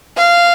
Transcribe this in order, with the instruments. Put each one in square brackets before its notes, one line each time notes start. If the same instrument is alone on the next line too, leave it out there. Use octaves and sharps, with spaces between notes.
[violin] F5